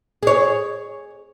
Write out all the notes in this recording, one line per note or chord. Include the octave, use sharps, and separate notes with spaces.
G#4 C#5